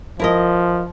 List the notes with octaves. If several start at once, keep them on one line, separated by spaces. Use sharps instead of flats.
F3 E4 A#4 D#5